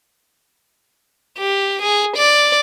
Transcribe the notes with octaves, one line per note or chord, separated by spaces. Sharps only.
G4
G#4
D5